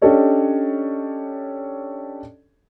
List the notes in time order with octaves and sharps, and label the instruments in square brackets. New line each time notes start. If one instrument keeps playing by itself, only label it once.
[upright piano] C#4 D4 G4 A4 C#5 D#5